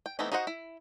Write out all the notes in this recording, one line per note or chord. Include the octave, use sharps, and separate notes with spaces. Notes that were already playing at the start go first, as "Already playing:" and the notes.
G5
E3 A3 B3 C4 D#4
D#4 F#4 C5 D#5 F#5
E4